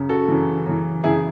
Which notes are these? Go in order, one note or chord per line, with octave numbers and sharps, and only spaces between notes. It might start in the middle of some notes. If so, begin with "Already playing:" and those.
Already playing: F#2 C#3
F#4 A4
F#2 C#3 E3
F#2 C#3 E3
F#2 C#3 E3 E4 G#4